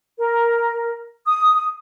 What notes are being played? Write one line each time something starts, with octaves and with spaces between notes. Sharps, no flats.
A#4
D#6